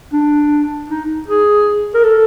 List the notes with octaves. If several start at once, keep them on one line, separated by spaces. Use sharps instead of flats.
D4
D#4
G#4
A#4
A4